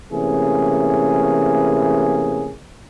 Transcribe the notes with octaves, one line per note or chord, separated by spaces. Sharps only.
C3 E3 A3 A#3 C#4 G#4